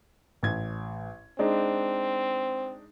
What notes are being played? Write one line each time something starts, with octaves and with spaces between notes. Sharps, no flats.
A1 G#6
G#3 C4 D4 D#4